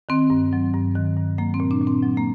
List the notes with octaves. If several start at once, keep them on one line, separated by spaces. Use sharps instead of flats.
D#3 C4
G2
F#3
G2
D#3
G2
F#3 A#3
C4
A#2
D4
A#2
C4
F#3
A#3